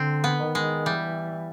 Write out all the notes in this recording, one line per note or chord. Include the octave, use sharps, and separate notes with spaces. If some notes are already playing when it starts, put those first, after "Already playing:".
Already playing: D3 C4
B3
D#3
G#3
E3 G3